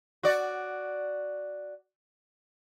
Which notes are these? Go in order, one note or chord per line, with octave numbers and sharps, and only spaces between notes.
F#4 D5